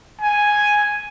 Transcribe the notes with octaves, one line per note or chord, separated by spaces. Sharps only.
G#5